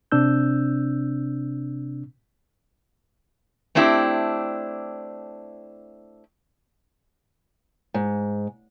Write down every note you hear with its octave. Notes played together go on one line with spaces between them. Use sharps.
C3 C4 D4 E6 G6
A3 C4 D4 E4 G4
G#2